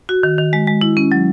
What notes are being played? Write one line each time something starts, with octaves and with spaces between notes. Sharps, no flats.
F#4
D#3
D#3
G#3
G#3
E4
C#4
F#3